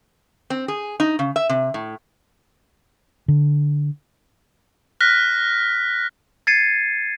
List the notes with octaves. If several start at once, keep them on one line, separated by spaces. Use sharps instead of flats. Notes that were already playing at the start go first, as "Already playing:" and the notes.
C4
G#4
D#4
C#3
E5
C3
A2
D3
F6 F#6 A#6 B6
G#6 A6 C7 C#7 D#7